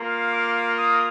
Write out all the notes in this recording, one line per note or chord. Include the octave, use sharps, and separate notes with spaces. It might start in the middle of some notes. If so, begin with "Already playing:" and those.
Already playing: A#3 F4
D6
D#6